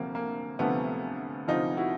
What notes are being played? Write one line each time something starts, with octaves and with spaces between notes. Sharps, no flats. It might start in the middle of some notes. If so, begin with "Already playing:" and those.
Already playing: D2 C3 F3 A#3
A#3
D2 C3 F3 A3 B3
D2 C3 F3 D#4 F4
E4 F#4